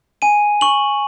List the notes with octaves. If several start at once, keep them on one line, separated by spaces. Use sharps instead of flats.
G#5 D#7
C#6 F#7